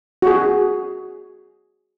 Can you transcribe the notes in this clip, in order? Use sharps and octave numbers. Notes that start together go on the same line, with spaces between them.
F#4 G#4